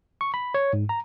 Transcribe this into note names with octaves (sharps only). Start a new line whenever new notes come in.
C#6
B5
C#5
G#2
A#5